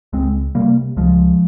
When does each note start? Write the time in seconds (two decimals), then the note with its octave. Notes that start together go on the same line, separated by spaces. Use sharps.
0.13 C#2 G#3 C4
0.55 C3 G3 A#3
0.97 C#2 F3 G#3